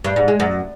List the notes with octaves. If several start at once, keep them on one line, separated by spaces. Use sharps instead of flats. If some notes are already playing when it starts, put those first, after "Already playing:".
G2
G#2
G#3
F#2